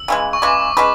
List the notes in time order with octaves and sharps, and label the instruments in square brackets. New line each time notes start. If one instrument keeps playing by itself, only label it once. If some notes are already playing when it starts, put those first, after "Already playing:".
Already playing: [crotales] E6
[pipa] C#3 E3 G#3
[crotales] C#6
[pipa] C#3 E3 G#3 [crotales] D6
[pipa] G#3 C#4 G#4 B4